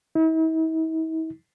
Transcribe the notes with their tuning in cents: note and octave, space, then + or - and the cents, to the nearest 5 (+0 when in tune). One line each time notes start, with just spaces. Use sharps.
E4 -45